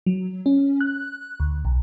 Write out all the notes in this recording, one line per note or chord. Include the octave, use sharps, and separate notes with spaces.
F#3
C#4
F#6
D2
B1